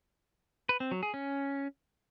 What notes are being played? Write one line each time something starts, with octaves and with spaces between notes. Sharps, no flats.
B4
C4
F#3
G#4
C#4